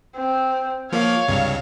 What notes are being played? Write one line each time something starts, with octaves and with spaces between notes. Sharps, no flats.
C4
F3 A#3 C#5 F5
C#2 G2 C3